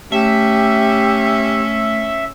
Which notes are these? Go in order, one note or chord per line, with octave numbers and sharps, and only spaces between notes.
A3 C#4 G4 E5